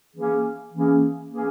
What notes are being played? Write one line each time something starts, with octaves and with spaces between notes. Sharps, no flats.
E3 A#3 C#4 G#4
E3 A#3 C#4 G#4
E3 A#3 C#4 G#4